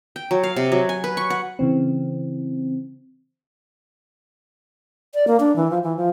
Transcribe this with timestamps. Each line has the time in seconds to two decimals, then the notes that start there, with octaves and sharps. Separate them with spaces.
0.16 G5
0.31 F#3
0.43 F5
0.56 C3
0.72 F#3
0.89 G#5
1.04 B4
1.17 C#6
1.30 F#5
1.59 C#3 E3 C4
5.14 D5
5.27 A#3
5.40 D4
5.56 E3
5.71 F3
5.83 E3
5.97 F3